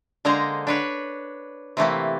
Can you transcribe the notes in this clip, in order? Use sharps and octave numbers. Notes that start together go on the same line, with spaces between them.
D3 G#3 A#3 C5 A#5
D4 B4 C#5
C3 E3 A3 A#3